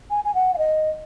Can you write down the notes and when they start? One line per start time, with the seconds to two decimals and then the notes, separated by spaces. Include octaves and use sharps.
0.10 G#5
0.24 G#5
0.34 F#5
0.54 F5
0.58 D#5